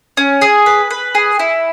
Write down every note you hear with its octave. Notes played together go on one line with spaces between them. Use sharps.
C#4
G#4
B4
B4
G#4
E4